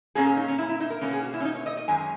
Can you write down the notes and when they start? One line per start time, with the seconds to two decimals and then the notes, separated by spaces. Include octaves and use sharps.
0.15 A#2 A#3 C#4 G#4
0.27 G#4
0.37 D#4
0.48 C#4
0.58 E4
0.69 E4
0.80 D#4
0.90 A#4
1.01 B2 A#3 C#4 A#4
1.13 G#4
1.23 F#4
1.34 E4
1.41 C#4
1.45 D#4
1.55 C#5
1.66 D#5
1.77 D#5
1.88 F#2 D#3 G#3 C#4 G#5